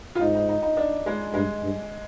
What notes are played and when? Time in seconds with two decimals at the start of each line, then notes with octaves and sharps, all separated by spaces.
0.15 F4
0.20 G#2 D#4
0.35 D#4
0.49 D#4
0.62 D#4
0.77 D4
1.06 G#3
1.34 G2 G#3
1.62 G2